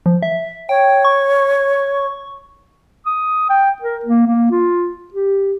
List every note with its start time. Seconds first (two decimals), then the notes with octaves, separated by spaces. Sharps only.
0.06 F3
0.23 E5
0.69 C#5 G5
1.05 C#6
3.06 D#6
3.50 G5
3.82 A#4
4.05 A#3
4.27 A#3
4.51 F4
5.14 G4